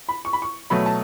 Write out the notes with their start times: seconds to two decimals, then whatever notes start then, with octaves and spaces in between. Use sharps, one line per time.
0.09 B5
0.25 C#6
0.33 B5
0.42 C#6
0.70 B2 F#3 A3 B5
0.86 A5